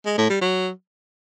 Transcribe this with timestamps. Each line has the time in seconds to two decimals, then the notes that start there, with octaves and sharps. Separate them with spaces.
0.06 G#3
0.18 A2
0.29 G3
0.41 F#3